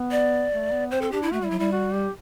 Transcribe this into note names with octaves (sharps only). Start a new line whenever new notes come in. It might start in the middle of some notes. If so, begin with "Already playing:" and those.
Already playing: B3
D5
A3
B3
C4 C5
A4
D4 G4
E4
A3 F#4
G3
E4
F#3
G3 E4
F#4
G4